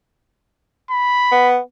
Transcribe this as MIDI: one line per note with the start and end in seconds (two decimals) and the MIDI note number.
0.91 1.49 83
1.32 1.59 59